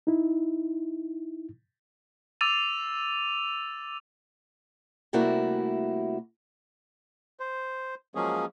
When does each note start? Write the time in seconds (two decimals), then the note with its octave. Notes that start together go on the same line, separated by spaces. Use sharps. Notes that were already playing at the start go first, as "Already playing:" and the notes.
0.07 D#4 E4
2.41 D6 E6 A6 D#7 F7
5.13 C3 G3 A3 A#3 E4 F#4
7.40 C5
8.15 F3 F#3 G#3 A#3 C#4 G#4